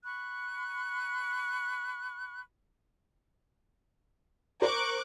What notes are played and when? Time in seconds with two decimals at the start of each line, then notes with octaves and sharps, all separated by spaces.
0.04 B5 C#6 F#6
4.62 A#4 C5 C#6 D6 F#6